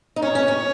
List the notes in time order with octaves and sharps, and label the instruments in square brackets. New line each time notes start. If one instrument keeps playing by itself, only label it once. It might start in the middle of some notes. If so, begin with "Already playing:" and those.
[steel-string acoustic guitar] D#4
[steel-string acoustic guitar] C#4 [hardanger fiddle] C#5
[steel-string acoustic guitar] C#4
C#4